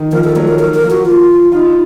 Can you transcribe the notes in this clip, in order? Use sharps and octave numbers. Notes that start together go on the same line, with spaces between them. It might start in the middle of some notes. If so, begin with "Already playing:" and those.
Already playing: D#3
F3 A#4
A4
F#3 A4
A#4
A#4
A#4
F3
F#4
F4
D#4 F4